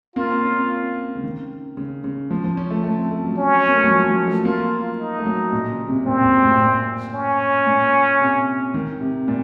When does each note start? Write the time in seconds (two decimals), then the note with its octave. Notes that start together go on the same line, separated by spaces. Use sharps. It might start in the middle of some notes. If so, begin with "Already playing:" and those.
0.16 A#3 F4
0.30 C4
0.43 C#4
0.56 C#4
1.16 C#3
1.24 D#3
1.77 C#3
2.04 C#3
2.31 F3
2.44 F3
2.57 C#4
2.71 A3
2.84 A3
2.97 C4
3.11 A3
3.24 F#3
3.38 C#4
3.68 A#3
3.76 A3
3.84 F#3
3.91 F3
4.09 F3
4.27 A3
4.45 A#3 F4
4.98 D#4
5.18 A3
5.25 F#3
5.52 A#2
5.70 C#3
5.88 C3
6.06 A#2 C4
6.24 F#2
6.42 A2
6.60 A#2
7.13 C#4
7.67 A#2
8.20 C3
8.74 D#3
9.01 C3
9.28 A#2